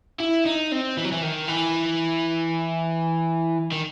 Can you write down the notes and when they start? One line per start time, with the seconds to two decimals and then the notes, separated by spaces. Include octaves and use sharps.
0.20 E4
0.45 D#4
0.72 C4
0.97 E3
1.04 F#3
1.12 E3
1.22 D#3
1.48 E3
3.72 D#3